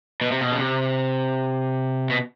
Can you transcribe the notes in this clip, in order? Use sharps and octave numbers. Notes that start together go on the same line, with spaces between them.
B2
C3
B2
C#3
C3
B2